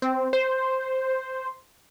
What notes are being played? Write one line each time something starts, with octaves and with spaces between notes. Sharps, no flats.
C4
C5